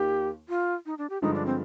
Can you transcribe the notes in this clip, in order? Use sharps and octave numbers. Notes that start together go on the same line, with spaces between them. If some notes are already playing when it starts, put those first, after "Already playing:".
Already playing: D#2 D#3 A#3 F4 G4
F4
D#4
D4
G4
G2 D3 F3 G#3 D#4
D4
C4